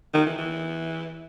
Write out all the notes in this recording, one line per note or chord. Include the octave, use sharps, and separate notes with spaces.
D#3
E3
E3